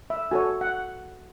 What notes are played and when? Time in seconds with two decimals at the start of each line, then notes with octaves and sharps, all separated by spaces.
0.10 E5
0.31 F#4 A4 C#5 G#5
0.61 F#5